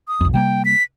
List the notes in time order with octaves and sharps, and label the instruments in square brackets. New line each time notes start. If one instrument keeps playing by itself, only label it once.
[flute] D#6
[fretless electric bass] B1 F2
[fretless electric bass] C3 G3 A#3 [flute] G5
[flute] B6